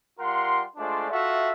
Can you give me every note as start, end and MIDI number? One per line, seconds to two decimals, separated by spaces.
0.20 0.64 55
0.20 0.64 65
0.20 0.64 70
0.20 0.64 78
0.20 0.64 84
0.77 1.07 56
0.77 1.07 57
0.77 1.07 62
0.77 1.07 65
0.77 1.07 72
0.77 1.07 74
1.09 1.52 65
1.09 1.52 66
1.09 1.52 69
1.09 1.52 76